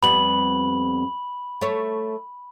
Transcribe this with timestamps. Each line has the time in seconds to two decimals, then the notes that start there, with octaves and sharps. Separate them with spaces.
0.03 F2 G3 B3 B5 F#7
1.61 A3 C#5